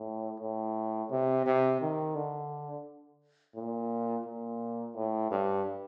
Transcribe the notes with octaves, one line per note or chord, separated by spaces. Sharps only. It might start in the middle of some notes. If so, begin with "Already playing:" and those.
Already playing: A2
A2
C3
C3
D#3
D3
A#2
A#2
A2
G2